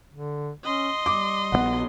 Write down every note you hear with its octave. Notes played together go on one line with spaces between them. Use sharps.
D3
C#4 D#5 C6
G3 D6
A#1 E3 B3 F#5